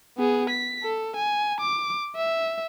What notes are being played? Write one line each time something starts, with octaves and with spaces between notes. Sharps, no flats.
B3 G#4
B6
A4
G#5
D6
E5